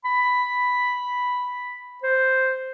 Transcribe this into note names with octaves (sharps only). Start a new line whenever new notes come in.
B5
C5